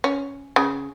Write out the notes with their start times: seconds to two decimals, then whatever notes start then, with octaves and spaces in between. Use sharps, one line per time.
0.04 C#4
0.56 C#3